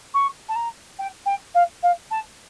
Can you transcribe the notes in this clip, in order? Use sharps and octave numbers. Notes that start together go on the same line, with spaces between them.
C#6
A5
A#5
G5
G5
F5
F5
A5